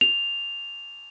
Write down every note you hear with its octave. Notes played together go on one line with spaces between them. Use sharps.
F7